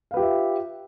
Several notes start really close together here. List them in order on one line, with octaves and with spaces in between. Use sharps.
F5 B4 G4 F4 E5